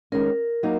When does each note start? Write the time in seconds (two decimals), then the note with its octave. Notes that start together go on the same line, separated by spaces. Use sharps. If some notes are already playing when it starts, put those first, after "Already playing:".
0.12 D#3 G#3 C#4 A#4
0.63 F#3 A#3 D#4